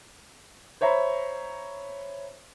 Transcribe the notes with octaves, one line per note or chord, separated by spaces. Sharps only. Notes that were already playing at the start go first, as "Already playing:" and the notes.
C5 C#5 E5 A#5 B5